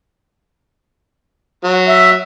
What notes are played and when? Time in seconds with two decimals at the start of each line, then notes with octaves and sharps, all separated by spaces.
1.64 F#3
1.88 E5